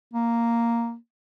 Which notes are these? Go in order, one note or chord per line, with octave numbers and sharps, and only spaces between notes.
A#3